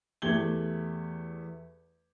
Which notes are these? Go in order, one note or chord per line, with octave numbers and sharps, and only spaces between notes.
E2 A3 G4 G#6 F#7 G7